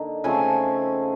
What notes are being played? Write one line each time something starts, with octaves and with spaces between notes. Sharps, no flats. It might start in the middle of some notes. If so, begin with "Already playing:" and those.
Already playing: D3 A#3 D#4
C#3 F3 A3 C4 G#5